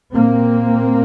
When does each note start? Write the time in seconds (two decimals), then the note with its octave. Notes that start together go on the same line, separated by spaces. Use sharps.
0.12 A#2 A#3 C4